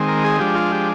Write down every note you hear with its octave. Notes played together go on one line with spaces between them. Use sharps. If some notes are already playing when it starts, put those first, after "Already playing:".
Already playing: D#3 G#3 C4
A#4
G#4
F3 G#3 D4 G4
F4
G4